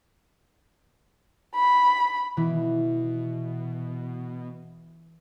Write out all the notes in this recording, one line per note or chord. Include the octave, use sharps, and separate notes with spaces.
B5
B2 E3